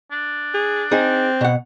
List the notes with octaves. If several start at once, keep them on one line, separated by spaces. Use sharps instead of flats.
D4
G#4
C4 D#4 G#4
B2 F#5